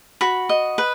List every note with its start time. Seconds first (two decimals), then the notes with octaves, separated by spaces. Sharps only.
0.21 F#4 B5
0.49 D#5
0.78 B4